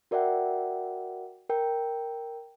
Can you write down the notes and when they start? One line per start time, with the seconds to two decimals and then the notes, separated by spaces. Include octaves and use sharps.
0.11 F#4 A#4 D5 E5 F#5 G5
1.50 A#4 G5